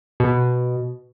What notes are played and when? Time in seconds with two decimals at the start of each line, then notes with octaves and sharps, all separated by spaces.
0.20 B2